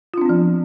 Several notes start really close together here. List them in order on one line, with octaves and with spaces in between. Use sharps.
F4 D4 C4 B3 F3